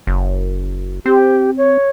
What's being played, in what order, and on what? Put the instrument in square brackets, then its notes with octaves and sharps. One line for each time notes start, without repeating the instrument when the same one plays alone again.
[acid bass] F#1
[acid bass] C4 [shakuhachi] G4
[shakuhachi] C#5